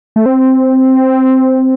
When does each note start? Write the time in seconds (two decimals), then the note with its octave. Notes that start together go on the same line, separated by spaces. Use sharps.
0.16 A3
0.26 C4